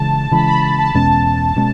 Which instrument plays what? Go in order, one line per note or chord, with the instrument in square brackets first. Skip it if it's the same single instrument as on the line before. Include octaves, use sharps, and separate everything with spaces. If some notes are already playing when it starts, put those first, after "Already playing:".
Already playing: [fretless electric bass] C#3 E3 G#3 [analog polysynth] A5
[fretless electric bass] C#3 E3 G#3 [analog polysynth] B5
[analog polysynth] B5
B5
A5
[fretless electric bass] E2 B2 G#3 C#4 [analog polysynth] A5
[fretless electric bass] B2 G#3 C#4